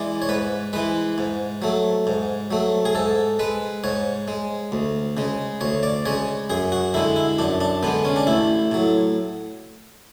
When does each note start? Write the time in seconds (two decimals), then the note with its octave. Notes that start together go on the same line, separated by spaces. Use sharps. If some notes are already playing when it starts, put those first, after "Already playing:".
Already playing: E3 G#3 D5
0.22 C#5
0.29 G#2 B4
0.73 E3 G#3 B4
1.18 G#2
1.62 F#3 A3
2.07 G#2
2.51 F#3 A3
2.85 G#4
2.95 G#2 A4
3.39 G#3 B4
3.84 G#2 C#5
4.28 G#3
4.72 D2
5.17 C#3 G#3
5.61 D2 C#5
5.83 D5
6.06 C#3 G#3 C#5
6.50 F#2 G#4
6.72 F#4
6.94 D3 G#3 E4
7.16 E4
7.38 F#2 D4
7.61 D4
7.83 D3 G#3 B3
8.05 C#4
8.16 D4
8.27 A1 E4
8.72 A2 F#3